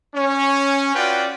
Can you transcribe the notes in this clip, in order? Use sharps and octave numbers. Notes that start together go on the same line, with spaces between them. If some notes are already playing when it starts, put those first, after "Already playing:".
C#4
F4 F#4 B4 D5 G5